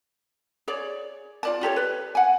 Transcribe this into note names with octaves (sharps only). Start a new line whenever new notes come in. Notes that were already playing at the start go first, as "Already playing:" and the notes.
G#4 C#5 D5
F4 D5 A5
F4 G4 A4 C#5
B4
F#5 G#5